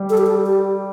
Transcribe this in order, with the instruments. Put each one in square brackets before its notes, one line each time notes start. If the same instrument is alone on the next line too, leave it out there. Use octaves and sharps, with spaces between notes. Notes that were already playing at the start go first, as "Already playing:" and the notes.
Already playing: [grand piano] G3
[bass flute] A4
G4
A4
G4